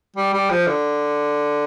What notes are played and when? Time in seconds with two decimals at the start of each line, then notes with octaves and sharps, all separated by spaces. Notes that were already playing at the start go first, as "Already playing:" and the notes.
0.16 G3
0.34 G3
0.50 F3
0.68 D3